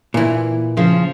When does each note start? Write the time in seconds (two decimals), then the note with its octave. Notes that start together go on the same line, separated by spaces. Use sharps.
0.14 A#2 E3
0.77 C#3 F3